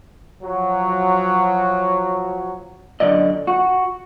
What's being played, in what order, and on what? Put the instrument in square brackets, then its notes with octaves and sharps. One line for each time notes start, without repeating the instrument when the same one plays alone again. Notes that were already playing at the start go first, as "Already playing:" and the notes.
[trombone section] F3 F#3
[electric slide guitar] F#2 D3 F3 D5 D#5
F#4